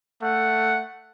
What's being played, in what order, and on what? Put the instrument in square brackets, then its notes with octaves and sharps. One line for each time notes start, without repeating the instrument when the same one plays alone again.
[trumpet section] A3 F#5